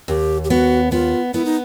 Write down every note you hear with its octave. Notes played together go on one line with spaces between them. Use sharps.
D#2 G4
G4
B3 F#4
B3 F4
B3 E4
D#4